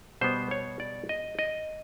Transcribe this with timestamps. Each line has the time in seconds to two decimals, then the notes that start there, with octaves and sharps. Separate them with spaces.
0.21 B2 G3 B3 C5
0.51 C#5
0.80 D5
1.09 D#5
1.39 D#5